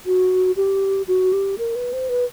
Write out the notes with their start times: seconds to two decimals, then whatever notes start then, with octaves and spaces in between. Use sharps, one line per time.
0.06 F#4
0.56 G4
1.08 F#4
1.33 G4
1.58 A#4
1.75 B4
1.93 C5
2.09 B4